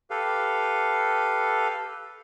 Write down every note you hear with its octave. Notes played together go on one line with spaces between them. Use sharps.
G4 A4 B4 F5